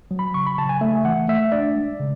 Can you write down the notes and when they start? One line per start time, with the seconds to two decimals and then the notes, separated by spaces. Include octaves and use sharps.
0.11 F#3
0.19 B5
0.34 C#3 C#6
0.47 B5
0.58 C#3 A5
0.69 G#5
0.81 A3 E5
1.05 E3 F#5
1.28 A3 E5
1.52 D4 D5
1.76 G#3
2.00 C#3